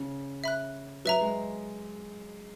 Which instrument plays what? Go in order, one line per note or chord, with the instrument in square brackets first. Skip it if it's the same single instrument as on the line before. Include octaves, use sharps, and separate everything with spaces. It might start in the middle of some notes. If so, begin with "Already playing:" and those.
Already playing: [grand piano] C#3
[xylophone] E5 B5 F#6
[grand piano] F#3 [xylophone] B4 E5 A#5
[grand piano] G#3